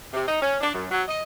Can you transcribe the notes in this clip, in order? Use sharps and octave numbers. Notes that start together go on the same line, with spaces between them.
C3
D#4
C#4
D4
F#2
F#3
D#5